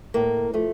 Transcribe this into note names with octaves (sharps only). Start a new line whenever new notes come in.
A2 A#3
F3 A3